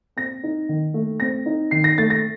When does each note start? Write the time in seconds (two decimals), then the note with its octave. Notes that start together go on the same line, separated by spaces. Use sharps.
0.17 C4 A#6
0.43 D#4
0.69 D#3
0.94 A3
1.20 C4 A#6
1.46 D#4
1.71 D#3 C7
1.84 A#6
1.98 A3 A6
2.10 A#6